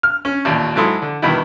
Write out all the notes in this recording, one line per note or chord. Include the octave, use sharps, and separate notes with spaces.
F6
C#4
A1 D#2 A#2
G#2 F#3 E4 A4 C6 D#6
D3
E2 G2 B2 D#3 E4